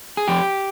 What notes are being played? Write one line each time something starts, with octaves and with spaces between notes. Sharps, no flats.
G#4
F2 G4